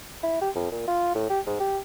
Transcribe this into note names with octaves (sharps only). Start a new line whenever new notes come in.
E4
G4
F2
A#2
F4
A2
G4
G#2
G4